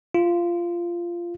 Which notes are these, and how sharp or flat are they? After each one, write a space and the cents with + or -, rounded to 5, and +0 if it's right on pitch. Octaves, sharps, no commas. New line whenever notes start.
F4 -15